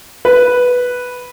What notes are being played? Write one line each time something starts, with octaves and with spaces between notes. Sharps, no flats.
B4